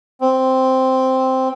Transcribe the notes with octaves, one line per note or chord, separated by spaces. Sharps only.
C4